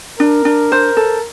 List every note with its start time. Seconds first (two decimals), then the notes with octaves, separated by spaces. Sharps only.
0.19 D4 A#4
0.45 D4
0.72 C5
0.97 A4